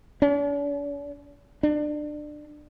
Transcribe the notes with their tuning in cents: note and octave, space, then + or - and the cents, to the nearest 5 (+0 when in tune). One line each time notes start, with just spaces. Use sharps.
D4 -45
D4 +25